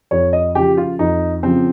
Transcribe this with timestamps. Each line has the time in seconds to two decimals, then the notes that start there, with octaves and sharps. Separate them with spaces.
0.11 F2 C#5
0.33 D#5
0.55 C#3 F3 G4
0.77 F4
0.99 F2 D#4
1.43 C#3 F3 C4